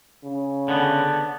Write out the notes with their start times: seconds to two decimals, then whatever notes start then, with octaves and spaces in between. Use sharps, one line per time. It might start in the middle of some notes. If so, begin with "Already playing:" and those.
0.25 C#3
0.68 D3 B3